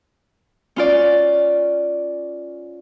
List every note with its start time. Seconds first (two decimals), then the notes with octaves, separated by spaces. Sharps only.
0.76 C#4 F4 D5